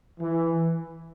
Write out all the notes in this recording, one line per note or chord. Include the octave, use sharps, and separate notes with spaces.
E3